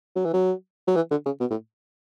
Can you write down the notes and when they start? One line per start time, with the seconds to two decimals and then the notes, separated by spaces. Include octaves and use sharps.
0.16 F#3
0.25 E3
0.33 F#3
0.87 F#3
0.96 E3
1.11 D3
1.26 C#3
1.40 B2
1.50 A2